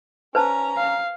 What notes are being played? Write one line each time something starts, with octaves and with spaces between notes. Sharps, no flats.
C#4 B4 C5 A5 A#5
F5